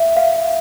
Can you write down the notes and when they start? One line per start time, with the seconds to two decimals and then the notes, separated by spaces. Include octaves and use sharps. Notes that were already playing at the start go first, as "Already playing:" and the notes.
Already playing: E5
0.17 F5